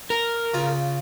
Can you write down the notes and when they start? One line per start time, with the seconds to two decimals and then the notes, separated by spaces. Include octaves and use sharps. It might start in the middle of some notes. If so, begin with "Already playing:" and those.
0.10 A#4
0.54 C#3 F4